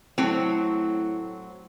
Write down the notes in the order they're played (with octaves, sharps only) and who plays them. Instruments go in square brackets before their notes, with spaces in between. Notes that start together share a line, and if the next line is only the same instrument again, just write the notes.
[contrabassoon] A2 [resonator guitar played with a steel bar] F#3 C4